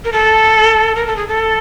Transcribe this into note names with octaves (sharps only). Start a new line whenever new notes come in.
A#4
A4
A#4
A4
G#4
A4